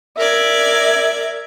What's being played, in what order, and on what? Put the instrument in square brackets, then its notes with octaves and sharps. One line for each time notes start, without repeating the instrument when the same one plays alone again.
[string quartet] A#4 D5 G#6 [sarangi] E5